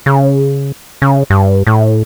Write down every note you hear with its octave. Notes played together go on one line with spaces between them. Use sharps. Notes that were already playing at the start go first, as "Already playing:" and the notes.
C#3
C#3
G2
A2